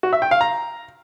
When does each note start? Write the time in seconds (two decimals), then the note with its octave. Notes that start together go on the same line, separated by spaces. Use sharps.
0.03 F#4
0.13 E5
0.22 G5
0.31 F5
0.41 A#5